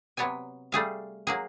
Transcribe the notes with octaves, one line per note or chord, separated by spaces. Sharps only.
C3 F#3 B3 C#5 D5 G#5
G3 A3 G#4 F5
F#3 A#3 G#4